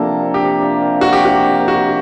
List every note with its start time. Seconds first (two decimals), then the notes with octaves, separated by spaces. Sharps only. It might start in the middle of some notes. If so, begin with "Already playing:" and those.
Already playing: C3 F3 A#3 D4 A4
0.34 G4
1.01 F#4
1.13 G4
1.25 F#4
1.68 F#4